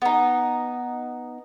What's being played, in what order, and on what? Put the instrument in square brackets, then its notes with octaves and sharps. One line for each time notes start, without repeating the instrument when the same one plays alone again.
[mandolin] B3 D#4